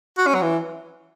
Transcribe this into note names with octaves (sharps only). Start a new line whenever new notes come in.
F#4
C#4
F#3
E3